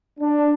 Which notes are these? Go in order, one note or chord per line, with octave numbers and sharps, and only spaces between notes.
D4